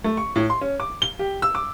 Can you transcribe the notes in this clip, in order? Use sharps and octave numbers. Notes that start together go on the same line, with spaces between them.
A3
C#6
A2
C6
C#4
D6
G7
G4
E6
D6